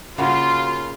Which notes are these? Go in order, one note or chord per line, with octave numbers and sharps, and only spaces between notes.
C#3 A#3 C#4 F4 F#4 C6